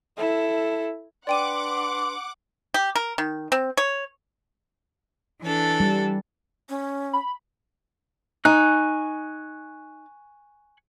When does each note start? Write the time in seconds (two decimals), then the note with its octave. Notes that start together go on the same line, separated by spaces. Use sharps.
0.17 E4 A4
1.27 D4 B4 D5 F#5 G5 C6 D6 D#7
2.74 G4
2.95 A#4
3.18 D#3
3.52 C4
3.77 C#5
5.41 E3 D4 A4
5.80 G3
6.69 C#4
7.13 B5
8.45 D#4 G#5 C#6 F#6